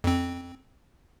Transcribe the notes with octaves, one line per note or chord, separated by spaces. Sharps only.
F2 C4